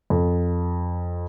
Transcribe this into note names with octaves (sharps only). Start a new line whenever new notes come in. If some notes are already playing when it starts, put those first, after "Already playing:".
F2